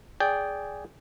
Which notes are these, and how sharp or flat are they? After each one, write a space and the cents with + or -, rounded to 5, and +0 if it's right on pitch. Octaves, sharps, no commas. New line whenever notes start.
G#4 +0 D5 -15 G5 +0